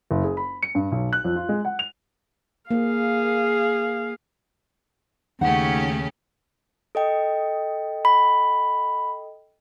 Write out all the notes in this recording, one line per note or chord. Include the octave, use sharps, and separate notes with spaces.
F#1
G#4
B5
C#7
G2
B1
F#6
F2
F4
G#3
F#5
F7
A#3 G#4 F5
D#2 C#3 A3 C#4 D#4 G4 F#5
A4 D#5 G5
B5